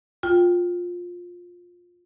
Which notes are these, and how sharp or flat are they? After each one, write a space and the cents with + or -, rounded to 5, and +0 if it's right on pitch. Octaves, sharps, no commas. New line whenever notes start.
F4 +15 G5 +0